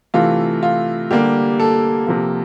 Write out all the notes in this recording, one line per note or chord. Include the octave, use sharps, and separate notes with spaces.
C3 E3 A3 F4
F4
D3 G3 A#3 G4
A4
C3 F3 A#3